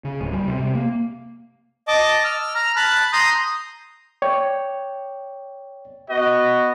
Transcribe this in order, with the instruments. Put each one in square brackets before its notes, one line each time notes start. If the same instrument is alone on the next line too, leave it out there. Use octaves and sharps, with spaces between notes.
[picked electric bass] C#3
D1
G3
C3
C3
A#3
[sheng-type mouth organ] D#5 A5 D6
E6 F6
A#5 F6
A5 B5 F#6
A#5 C6 D#6 G6
[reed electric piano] C#5 D5 G5
[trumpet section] B3 F#4 D#5